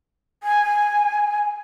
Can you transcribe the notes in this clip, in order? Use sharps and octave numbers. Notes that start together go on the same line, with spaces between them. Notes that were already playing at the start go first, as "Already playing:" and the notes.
G#5